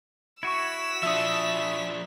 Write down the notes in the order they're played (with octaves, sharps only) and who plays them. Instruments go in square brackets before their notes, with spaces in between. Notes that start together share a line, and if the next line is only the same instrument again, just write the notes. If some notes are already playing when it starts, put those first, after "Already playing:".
[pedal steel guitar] E4 F#4 [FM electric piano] C#6 G#6 [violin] E6 B6
[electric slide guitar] F3 D4 [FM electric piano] E5 D#6